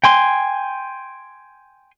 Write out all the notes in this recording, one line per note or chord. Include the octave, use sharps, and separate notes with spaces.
G5 G#5 C6